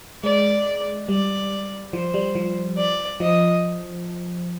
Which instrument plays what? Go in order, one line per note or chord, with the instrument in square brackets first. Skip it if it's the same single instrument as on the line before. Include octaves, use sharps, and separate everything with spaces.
[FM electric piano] G#3 [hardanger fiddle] D5
[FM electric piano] G3 [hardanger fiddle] D5
[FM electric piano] F3 [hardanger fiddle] C5
[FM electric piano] G3
F3
[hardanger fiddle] D5
[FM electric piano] F3 [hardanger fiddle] D#5